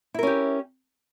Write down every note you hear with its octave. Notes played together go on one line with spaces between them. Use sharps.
C#4 E4 G4 A#4